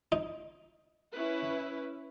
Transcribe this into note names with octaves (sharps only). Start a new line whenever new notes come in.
D#4
C#4 E4 B4